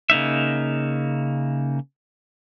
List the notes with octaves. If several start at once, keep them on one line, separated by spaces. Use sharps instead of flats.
C#3 A#3 D#4 E5